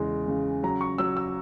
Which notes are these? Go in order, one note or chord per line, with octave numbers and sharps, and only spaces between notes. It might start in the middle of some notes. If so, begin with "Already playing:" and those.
Already playing: E2 C#3 G#3
C#3
F#3 A#5
C#6
F#3 E6
E6